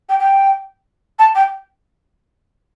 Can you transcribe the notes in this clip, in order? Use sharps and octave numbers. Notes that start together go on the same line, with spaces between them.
G5
G5
A5
G5